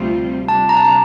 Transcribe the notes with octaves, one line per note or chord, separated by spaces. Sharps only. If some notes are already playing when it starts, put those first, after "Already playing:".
Already playing: D2 C3 G3 C4 F4
C3 G3 D4 A5
A#5
A5
A#5